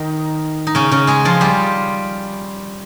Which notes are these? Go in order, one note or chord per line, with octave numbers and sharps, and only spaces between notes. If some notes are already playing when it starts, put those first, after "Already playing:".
Already playing: D#3 D#4
D#4
C#3 C#4
C#3 C#4
G#3 G#4
F3 F4
G3 G4